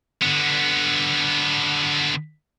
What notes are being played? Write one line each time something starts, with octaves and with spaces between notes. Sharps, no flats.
D3 B3